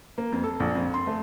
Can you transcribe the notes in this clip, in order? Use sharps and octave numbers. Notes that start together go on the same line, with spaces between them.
A#3
F2
A4
A#1
F2
C6
A3